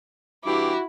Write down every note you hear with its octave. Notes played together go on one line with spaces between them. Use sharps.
G2 E3 E4 F#4 G4 D6